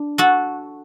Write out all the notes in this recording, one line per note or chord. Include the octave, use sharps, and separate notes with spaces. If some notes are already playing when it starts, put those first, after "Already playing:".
Already playing: D4
F#4 A4